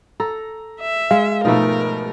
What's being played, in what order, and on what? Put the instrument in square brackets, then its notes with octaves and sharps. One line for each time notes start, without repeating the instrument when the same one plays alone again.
[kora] A4 [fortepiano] A#5
[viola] E5
[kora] G#3 [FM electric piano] F5
[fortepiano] G#2 B2 A3 [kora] F3 D#4 [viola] G#3 A#4